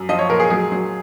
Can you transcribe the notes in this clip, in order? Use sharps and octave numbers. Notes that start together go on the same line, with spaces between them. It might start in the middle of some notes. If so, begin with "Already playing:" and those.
Already playing: F#2
F3 D#5
C#5
A#2 A#4
G#4
F#3 G#4
F#3